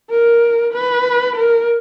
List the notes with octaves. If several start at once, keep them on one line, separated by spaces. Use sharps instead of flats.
A#4
B4
A#4